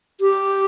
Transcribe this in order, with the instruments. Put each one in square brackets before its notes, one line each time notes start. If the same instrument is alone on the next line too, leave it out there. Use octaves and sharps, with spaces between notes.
[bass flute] G4